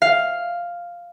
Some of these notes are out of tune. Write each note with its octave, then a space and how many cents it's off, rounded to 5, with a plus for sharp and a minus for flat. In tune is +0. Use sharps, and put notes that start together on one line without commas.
F5 +0